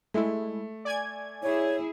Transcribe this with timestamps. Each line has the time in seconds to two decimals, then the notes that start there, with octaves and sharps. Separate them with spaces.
0.14 G#3 A3 E4
0.85 D5 G#5 G#6
1.43 E4 G#4 C#5